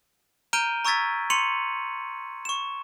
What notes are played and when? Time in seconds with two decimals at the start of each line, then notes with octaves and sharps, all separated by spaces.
0.53 A#5 F6 G6 D7 D#7 G7
0.85 A#5 C#6 E6 G#6 A6 B6
1.30 C6 C#6 C#7 D#7 F7 F#7
2.45 C#6 E7